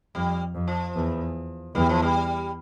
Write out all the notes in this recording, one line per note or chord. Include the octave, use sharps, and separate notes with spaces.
F2 G3
F2
F3
E2
E2 G3
F3
G3